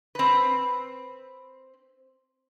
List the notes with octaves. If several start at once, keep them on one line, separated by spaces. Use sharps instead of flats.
C4 B4